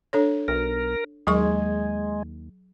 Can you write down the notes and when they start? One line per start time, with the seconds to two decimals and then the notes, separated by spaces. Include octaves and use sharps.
0.13 D4 A4 C#5
0.48 B1 A#4
1.27 D#2 F#3 G#3 G#4 C#6